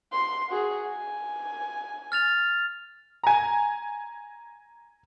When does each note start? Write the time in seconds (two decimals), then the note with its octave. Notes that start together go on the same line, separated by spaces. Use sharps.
0.12 C6
0.49 F#4 G#4
0.88 G#5
2.12 F6 A6 F7
3.23 G#5 A#5